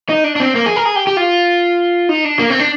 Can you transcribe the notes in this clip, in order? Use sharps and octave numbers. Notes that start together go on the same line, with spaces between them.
D#4
D4
D4
C4
A#3
G#4
A#4
G#4
G4
G4
F4
D#4
D4
A#3
C4
D4